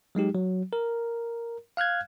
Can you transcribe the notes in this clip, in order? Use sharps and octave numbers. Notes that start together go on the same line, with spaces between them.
F#3 G#3 D#4 G4
F#3
A#4
F5 F6 F#6 G#6